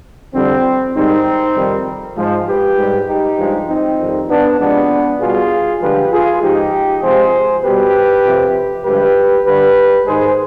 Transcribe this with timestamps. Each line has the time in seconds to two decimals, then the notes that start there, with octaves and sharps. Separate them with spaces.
0.35 F2 D3 G3 C4
0.95 G#2 D#3 G3 C4 D#4
1.56 F2 C3 D#3 G3
2.17 G#2 F3 G#3
2.47 G4 B4
2.78 G#2 G3
3.07 D#4 G4
3.38 G2 F3 G#3
3.69 C4 D#4
3.99 F2 D#3 G3
4.29 B3 D4
4.60 C3 F3 G#3 B3 D4
5.20 B2 G3 F4 G#4
5.81 G2 D3 F3 G#3 G4 B4
6.11 F4 G#4
6.42 G#2 F3 G#3 D#4 G4
7.03 C3 F3 G#3 G#4 C5
7.63 B2 G3 G4 B4
8.24 F2 C3 F3
8.85 G2 D3 F3 G#3 G4 B4
9.46 G2 D3 G3 G4 B4
10.06 G#2 D#3 G#3 G#4 C5